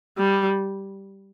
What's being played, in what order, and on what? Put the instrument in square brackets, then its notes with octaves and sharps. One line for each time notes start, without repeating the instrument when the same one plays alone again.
[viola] G3